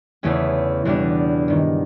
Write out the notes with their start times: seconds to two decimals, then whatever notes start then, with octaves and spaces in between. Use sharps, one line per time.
0.23 E2 C#3 E3 A3 C#4
0.85 E2 B2 G3 B3 D4
1.48 G2 D#3 G#3